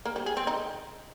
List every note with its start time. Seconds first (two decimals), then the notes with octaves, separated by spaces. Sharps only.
0.05 A#3
0.16 G3
0.26 G#4
0.37 C4
0.47 D#4